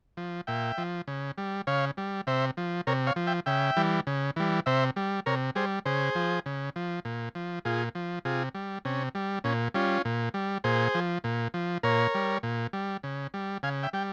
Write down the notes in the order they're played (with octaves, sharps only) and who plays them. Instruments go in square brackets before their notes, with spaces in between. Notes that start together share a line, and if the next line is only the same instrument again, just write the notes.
[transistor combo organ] F3
A#2 E5 G5
F3
C#3
G3
C#3 C#5 F5
G3
C3 C5 E5
F3
C3 A#4 C#5
C#5 F5
F3
E5 G5
C#3 E5 G5
E3 G3
C#3
E3 G3
C3 C5 E5
G3
C3 A#4 C#5
G3 G#4 C5
C#3 G#4 C5
F3
C#3
F3
A#2
F3
A#2 F4 G#4
F3
C3 F4 G#4
G3
C3 C#4
G3
A#2 C#4
G3 C#4 F4
A#2
G3
A#2 G#4 C5
F3
A#2
F3
A#2 A#4 C#5
G3
A#2
G3
C#3
G3
C#3 F5 G#5
E5 G5
G3 G5